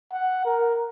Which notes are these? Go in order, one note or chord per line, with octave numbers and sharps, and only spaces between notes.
F#5
A#4